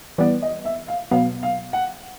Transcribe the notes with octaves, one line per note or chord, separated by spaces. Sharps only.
E3 G3 B3 D5
D#5
E5
F5
B2 F#3 B3 F5
F5
F#5